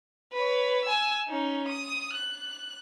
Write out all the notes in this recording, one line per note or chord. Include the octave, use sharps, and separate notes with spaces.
B4 C#5
G#5 E6
C#4 D#4
D#6
F#6